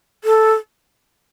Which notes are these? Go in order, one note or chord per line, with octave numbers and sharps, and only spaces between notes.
A4